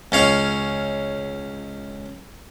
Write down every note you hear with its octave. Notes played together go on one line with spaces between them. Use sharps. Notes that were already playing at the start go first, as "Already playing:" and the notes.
C#2 C#4 F5